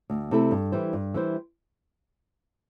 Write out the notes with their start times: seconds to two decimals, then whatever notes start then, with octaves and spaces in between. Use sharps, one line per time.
0.10 D2
0.31 C3 A3 E4 A4
0.51 G2
0.72 E3 G3 E4 C5
0.93 G2
1.14 E3 G3 E4 C5